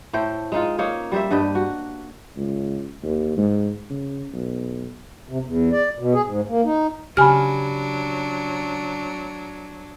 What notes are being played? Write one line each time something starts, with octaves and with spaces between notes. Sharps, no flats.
A2 A3 C5 G5
G#3 D#4 F4
A#3 C#4 D#4 C#5
G3 C5 E5
G2 D4 G4 D#5
F#4
C#2
D#2
G#2
C#3
B1
C3
E2
D5
B2
G#4
G#2
A#3
D#4
C#3 F#3 D4 G4 G#5 B5 F6